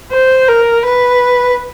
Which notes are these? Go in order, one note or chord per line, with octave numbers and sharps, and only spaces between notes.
C5
A#4
B4